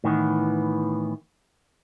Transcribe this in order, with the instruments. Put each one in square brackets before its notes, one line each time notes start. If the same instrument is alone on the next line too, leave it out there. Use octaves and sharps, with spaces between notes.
[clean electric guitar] A2 D#3 E3 B3